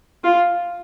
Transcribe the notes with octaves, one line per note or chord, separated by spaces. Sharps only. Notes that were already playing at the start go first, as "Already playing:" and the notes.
F4